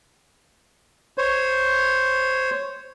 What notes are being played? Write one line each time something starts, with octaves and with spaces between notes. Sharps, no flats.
C5 C#5